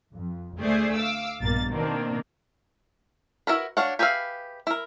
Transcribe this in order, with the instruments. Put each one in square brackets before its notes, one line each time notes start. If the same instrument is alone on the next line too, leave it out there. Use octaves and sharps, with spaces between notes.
[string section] F2
D2 A3 G#4 C5 D5
F5 D6 E6
A#1 G2 B2 A#3 A6
B2 D#3 A#3 C4 D4
[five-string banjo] E4 F#4 A#4 B4
D4 F#4 C#5 F5 F#5
G4 G#4 B4 E5 F5
E4 A#4